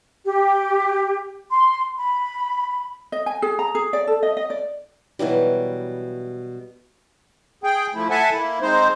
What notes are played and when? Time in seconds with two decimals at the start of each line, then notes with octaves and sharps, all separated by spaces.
0.24 G4
1.49 C6
1.96 B5
3.12 D#5
3.26 G#5
3.42 G#4
3.59 A#5
3.75 G#4
3.93 D5
4.07 A4
4.23 D#5
4.37 D#5
4.50 D5
5.19 B2 E3 F#3 G3
7.64 G#4 G5
7.95 F3 A3 E4
8.10 A4 E5 F#5 G#5 A5
8.32 A#3 E4
8.61 G#3 C4 D#4 C5